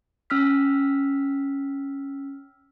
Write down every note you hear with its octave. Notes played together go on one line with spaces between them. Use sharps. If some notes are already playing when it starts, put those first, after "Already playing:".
C#4 E6 F6 B6